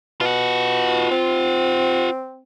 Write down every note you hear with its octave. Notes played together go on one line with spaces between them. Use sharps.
B2 F4 F#5
C4